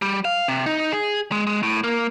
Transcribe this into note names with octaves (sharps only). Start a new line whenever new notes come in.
G3
F5
C3
D#4
G#4
G#3
G#3
A2
A#3